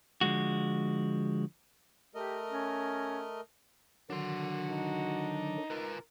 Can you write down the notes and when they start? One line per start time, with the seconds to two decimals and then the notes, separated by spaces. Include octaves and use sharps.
0.21 D3 F3 G#3 F#4
2.15 A3 G4 A#4 D#5
2.50 C#4
4.10 D3 D#3 F#3 D4 F#4 C6
4.69 D#4
5.70 F4 A#4 B4